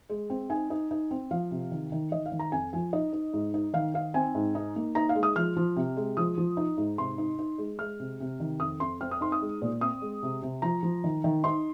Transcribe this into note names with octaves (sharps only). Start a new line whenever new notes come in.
G#3
C4
D#4 G#5
D#4
D#4
C4
F3 F5
C3
D#3
D#3
D#3 D#5
F5
D#3
A#5
F2 G#5
F3 G#5
D#4 D#5
D#4
G#2
D#4
D#3 F5
D#4 F5
C4 G#5
G#2
D#4
A#3
D#4 A#5
F5
G#3
D#6
F3 F6
F3
C3
G#3
F3 D#6
F3
D#4
G#2
C3 C6
D#4
D#4
G#3
G#3 F6
C3
C3
D#3
F2 D#6
F2 C6
C4 F6
D#6
D#4 C6
D#6
G#3
A#2
C4 D#6
G#3
C3
C3
F3 A#5
F3
D#3
D#3
D#4 C6